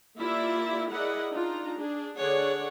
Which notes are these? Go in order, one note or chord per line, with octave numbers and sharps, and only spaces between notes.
A#3 E4 F4 G4 D5 E5
E4 G#4 A#4 D5 D#5 F#5
D4 D#4 F4 A#5
D4 G#4
D3 D4 G#4 C#5 D5 F#5